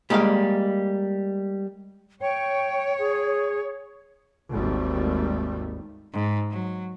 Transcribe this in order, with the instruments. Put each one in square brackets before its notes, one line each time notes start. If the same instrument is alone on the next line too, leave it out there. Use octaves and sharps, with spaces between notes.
[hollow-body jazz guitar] G3 G#3 A#3 D5 F5
[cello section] C#5 [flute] G5
[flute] G#4
[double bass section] G#1 D#2 G3 A3
[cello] G#2
F#3